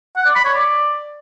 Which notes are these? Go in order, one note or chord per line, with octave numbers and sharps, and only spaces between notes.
F#5
D5
B5
C#5
D5